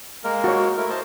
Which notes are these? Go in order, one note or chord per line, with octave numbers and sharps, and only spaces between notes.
G#3 A#3 A#4
F#4 C#5
A3 E4 A#4
C5 D#5 A5